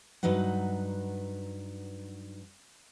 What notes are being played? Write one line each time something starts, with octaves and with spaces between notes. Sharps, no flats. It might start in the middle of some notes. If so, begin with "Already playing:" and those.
G2 F#3 D#4 B4 F#5